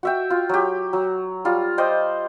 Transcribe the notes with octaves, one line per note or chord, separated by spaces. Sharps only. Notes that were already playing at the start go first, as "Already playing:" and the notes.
F#4 E5 G5
F4
F#3 G4
F#3
G3 F4
C5 D5 D#5 G5